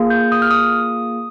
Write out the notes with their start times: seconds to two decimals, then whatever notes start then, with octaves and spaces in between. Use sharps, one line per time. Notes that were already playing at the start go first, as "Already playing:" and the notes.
Already playing: A#3 F4 G#4
0.10 G6
0.32 D#6
0.42 F6
0.51 D#6